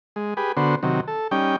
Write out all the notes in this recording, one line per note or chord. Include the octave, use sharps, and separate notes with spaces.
G#3
G4 G#4 B4
D3 B3 F#4 C5
C3 D#3 F#3
A4
G3 C#4 D#4 G5